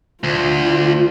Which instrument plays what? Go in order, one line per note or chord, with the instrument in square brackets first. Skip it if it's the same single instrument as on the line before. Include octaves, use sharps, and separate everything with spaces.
[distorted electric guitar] D2 [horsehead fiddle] F4